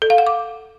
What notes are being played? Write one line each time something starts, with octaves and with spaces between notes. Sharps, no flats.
A4
F5
F#5
D6